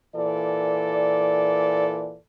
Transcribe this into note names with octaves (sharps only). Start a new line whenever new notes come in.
A#2 E3 A4 D5